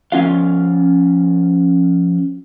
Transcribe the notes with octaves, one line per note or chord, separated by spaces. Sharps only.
F3 C#4 F4 F5